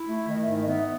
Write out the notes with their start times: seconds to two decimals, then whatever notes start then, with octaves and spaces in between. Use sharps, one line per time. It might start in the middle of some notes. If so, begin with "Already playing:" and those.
Already playing: E4
0.08 A3
0.28 D#3 D#5
0.41 E5
0.48 G#2
0.62 D#5
0.67 B3 E5